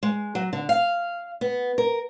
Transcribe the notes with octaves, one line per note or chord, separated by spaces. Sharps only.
G#3
F#3
D3
F5
B3
A#4